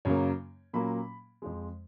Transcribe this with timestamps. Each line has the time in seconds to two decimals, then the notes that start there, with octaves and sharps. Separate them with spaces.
0.05 F#2 C#3 F#3 A#3 C#5
0.73 A#2 F#3 A#3 C#4 B5
1.42 F2 F3 G#3